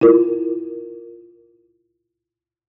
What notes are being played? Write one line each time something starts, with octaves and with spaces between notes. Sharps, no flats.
E4 F4 A#4